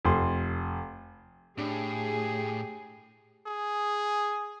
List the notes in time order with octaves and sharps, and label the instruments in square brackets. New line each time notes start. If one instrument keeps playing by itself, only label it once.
[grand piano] F1 C6
[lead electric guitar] A2 [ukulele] D4 [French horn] G4 [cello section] G#4
[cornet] G#4